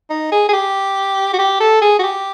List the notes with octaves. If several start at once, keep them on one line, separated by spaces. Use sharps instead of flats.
D#4
G#4
G#4
G4
F#4
G4
A4
G#4
F#4
G4